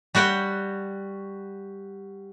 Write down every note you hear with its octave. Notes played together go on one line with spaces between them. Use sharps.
G3 F#4 F#5 G5